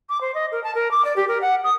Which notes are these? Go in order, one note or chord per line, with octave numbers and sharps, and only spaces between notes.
D6
C5
D#5
A#4
A5
A#4
D6
D5
G4
A#4
F#5
D#6